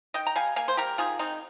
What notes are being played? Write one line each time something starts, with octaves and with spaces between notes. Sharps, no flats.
D#3 D#5 G5
A#5
G3 F5 G#5
A#3 F5 G#5
C5
G3 G4 A#4
D#3 F4 G#4
D#3 C4 D#4